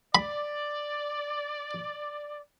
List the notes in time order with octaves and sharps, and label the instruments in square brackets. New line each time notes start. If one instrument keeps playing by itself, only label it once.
[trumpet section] D5 [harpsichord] B5